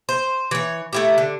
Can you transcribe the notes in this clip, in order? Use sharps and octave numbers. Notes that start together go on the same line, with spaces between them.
C5
E3 C#5
A3 E4 G4
D3